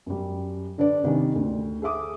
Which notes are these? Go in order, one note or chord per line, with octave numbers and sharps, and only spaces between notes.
F#2 G3
D3 D4 B4 D5
C3 D#3 G3 C#4
D2
G#4 A4 E5 D6 D#6